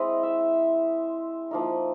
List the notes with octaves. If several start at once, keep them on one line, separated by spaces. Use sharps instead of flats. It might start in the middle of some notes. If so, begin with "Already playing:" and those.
Already playing: G#3 C4 E4 D#5
E5
F3 A#3 D#4